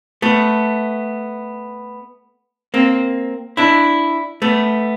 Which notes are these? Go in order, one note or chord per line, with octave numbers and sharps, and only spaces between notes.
A3 B3
A#3 C4
D4 E4
A3 B3